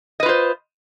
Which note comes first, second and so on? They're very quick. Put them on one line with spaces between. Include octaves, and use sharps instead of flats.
D#5 B4 F4 C5